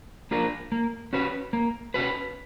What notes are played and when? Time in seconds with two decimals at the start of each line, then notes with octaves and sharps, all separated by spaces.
0.31 A#3 D4 F4 A#4
0.72 A#3
1.13 C#4 F#4 B4
1.53 A#3
1.94 C#4 F#4 B4